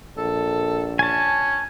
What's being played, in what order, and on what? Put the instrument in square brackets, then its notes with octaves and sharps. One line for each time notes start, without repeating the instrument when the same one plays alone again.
[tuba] A#1 [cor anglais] A4
[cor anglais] C#4 [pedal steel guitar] G#5 A5